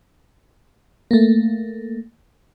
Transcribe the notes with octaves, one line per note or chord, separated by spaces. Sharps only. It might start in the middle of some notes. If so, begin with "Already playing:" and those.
A3 A#3